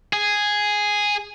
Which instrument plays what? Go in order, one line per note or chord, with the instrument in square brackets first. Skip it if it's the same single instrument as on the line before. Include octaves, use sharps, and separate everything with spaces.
[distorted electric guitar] G#4